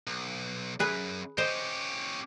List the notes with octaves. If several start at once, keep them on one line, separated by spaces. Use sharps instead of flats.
B1
F#2 G#4 B4
C#4 G4 C5 D#5